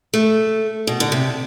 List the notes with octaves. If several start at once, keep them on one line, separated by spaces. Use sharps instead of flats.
A3
B2
D3
C3